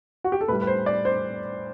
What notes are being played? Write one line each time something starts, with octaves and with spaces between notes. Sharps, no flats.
F#4
G4
A4
A2 G3 B4
B4
C5
D5
C5